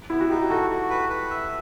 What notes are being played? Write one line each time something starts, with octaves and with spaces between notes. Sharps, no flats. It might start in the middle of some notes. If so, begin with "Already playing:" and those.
B3 E4
F#4
D#4 G4
F#4 A4
F#4
B4
B4
E5